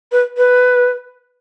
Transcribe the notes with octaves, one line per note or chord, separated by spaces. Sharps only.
B4
B4